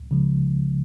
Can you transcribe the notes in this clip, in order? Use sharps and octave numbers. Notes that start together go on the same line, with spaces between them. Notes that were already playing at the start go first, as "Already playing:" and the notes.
Already playing: C#2
C#3 F3 G#3